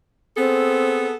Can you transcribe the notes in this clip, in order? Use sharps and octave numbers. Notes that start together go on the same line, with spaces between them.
B3 C4 G#4 A4